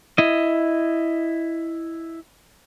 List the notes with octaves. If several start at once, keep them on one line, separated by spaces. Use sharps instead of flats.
E4 D#5